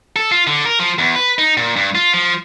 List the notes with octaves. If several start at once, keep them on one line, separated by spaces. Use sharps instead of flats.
A4
F4
D3
A#4
F3
E2
B4
D#4
A#2
G2
F4
F3